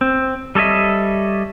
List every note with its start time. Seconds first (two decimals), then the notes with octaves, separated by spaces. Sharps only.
0.01 C4
0.55 G3 A4 C#5 D#5 E5